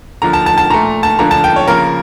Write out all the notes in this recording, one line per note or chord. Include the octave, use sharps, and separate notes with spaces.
D3 F3 A#3 A#5
A5
A5
A5
A#2 A3 A#5
A5
D3 F3 A#3 A#5
A5
G5
C#5
C#3 F3 A#3 A#4